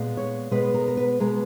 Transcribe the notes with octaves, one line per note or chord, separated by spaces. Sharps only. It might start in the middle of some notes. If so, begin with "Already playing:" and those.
Already playing: A#2 G#3 B3
C#5
B2 G#3 B3 B4
A#4
A#4
B4
B2 G#3 B3 A#4